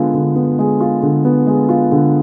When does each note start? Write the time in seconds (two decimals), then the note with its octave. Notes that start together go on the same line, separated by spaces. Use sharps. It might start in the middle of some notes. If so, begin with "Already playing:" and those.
Already playing: D3 G#3 B3 F4
0.14 D3
0.36 B3
0.59 G#3
0.80 F4
1.03 D3
1.25 B3
1.47 G#3
1.69 F4
1.92 D3